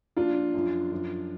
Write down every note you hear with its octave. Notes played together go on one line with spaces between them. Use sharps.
A#2 F3 D4 F4
F#2 F3
F#2 F3